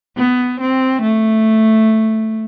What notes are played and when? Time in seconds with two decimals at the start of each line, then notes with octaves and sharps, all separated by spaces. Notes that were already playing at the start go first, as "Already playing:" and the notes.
0.17 B3
0.60 C4
1.02 A3